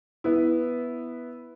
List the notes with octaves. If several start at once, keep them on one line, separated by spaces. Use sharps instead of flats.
B3 E4